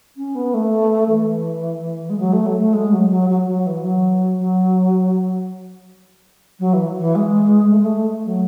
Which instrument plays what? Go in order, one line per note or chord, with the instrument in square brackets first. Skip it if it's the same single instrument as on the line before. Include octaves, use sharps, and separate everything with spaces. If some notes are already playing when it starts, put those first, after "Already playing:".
[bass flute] C#4
B3
A3
E3
G#3
F#3
A3
F#3
A3
G#3
F#3
F#3
F#3
F#3
E3
F#3
F#3
F#3
E3
E3
G#3
A3
G#3
A3
F#3